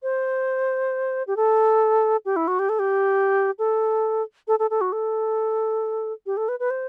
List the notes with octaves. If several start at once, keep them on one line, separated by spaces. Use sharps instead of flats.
C5
G4
A4
G4
E4
F#4
G4
A4
G4
A4
A4
A4
A4
F#4
A4
G4
A4
B4
B4
C5